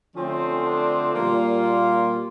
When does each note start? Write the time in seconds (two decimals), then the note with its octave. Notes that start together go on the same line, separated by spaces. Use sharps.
0.16 D3 F3 A3 C4 C#4
0.65 D4
1.14 A#2 G3 A#3 F4